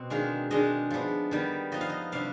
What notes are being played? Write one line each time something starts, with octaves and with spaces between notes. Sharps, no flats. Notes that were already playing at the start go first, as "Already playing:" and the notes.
Already playing: B2 C4
D#3 G#3 D4 F5
D#3 G#3 D4 D#5
F3 B3 D4
D#3 G3 B3
F3 B3 D#4 D#5
F5
D#5
C3 G3 D4 F5